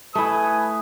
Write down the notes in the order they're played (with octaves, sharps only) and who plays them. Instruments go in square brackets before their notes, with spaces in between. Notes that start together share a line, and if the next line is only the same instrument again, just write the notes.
[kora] A3 E4 [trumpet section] B4 G#5 D#6